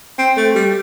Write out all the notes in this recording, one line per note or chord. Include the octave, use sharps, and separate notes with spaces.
C4
A3
G3